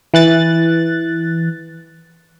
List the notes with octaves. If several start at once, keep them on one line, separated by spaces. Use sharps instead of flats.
E3 F#6 A6